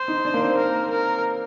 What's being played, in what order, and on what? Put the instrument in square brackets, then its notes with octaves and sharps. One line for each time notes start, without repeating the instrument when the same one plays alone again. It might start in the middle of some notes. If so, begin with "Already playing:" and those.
Already playing: [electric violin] C5
[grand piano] D#4
D4
A#3
C4
[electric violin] A#4
A#4